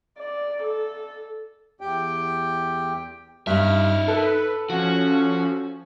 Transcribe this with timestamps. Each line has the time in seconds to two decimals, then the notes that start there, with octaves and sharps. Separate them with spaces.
0.18 D5
0.62 A4
1.81 E2 G4 G5
3.47 G2 D#4 E5 F6
4.08 A4 B4
4.70 F3 C#4 F#4